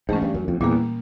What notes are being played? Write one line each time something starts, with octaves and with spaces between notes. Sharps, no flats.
G#2 E3 A3 C#4
G2
F#2
F2
E2 A#2 G3 A#3